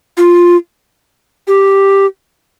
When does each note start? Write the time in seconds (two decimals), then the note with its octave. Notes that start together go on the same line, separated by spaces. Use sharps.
0.17 F4
1.47 G4